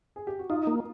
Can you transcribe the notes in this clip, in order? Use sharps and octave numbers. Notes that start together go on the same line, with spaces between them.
G#4
G4
F#4
D#4 F4
A#3